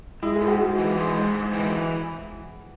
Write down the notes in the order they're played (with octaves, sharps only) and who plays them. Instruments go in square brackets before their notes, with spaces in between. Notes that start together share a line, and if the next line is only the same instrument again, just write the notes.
[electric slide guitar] G#3 [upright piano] E4
[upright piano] G#4
[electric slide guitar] G#2
[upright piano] F#4
[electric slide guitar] G#2
E3
G#3
G#2
G#2
E3